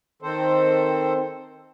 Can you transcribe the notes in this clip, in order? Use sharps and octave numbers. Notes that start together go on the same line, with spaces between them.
D#3 C4 A4 C5